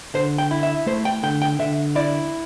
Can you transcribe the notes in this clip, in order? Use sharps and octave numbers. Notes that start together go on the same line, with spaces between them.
D3 C5
G5
E4
E5
A3 C5
G5
D3 G5
G5
D3 E5
E4 D5